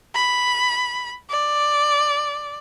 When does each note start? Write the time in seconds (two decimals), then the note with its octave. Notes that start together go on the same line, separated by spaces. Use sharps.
0.15 B5
1.30 D5